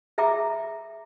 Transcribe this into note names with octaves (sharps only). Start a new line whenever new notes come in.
G#4 E5 G5 A#5 D6